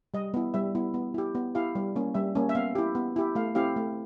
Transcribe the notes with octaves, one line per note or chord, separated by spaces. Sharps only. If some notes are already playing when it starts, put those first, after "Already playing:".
G3 D#5
B3 E4
G3 E5
B3 E4
B3
E4 G4
B3
E4 G4 F5
G3
A#3 C#4
G3 E5
A#3 C#4
E5
B3 F5
E4 G4
B3
E4 G4
A3 F5
C4 E4 G4 F5
A3